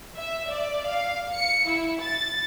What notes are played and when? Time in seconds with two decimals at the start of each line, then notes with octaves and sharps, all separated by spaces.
0.17 E5
0.49 D5
0.87 F5
1.33 C#7
1.68 E4
2.01 A6